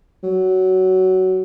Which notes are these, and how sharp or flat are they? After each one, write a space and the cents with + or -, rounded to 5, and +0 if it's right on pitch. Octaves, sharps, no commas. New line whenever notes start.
F#3 +15